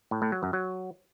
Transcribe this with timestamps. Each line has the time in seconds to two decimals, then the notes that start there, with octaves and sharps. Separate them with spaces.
0.11 A2
0.22 A2
0.32 F#3
0.43 F#2
0.53 F#3